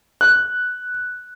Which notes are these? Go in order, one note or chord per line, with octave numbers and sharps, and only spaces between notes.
F#6